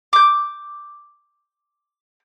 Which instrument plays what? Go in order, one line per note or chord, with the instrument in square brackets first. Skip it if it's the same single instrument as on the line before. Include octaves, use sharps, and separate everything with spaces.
[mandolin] D6 G6